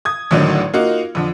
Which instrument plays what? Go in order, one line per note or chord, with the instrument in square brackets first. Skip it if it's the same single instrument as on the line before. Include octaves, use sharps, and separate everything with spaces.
[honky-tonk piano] D#6 G#6
G#1 A2 D3 D#3 F#3
A#3 D#4 F4 F#4
F2 D3